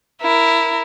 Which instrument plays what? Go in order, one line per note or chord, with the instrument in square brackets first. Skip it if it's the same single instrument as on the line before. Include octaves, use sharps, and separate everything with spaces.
[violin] E4 A#4